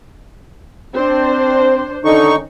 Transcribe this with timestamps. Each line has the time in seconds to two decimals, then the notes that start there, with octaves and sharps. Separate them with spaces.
0.94 C4 D4 C5
2.05 D3 D#3 C#4 D#4 C#6